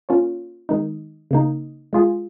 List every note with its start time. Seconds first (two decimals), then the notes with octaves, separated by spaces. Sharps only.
0.09 A#3 C#4 F4 C#5
0.69 D#3 G#3 D#4
1.31 C#3 A#3 D#4
1.93 G#3 F4 G#4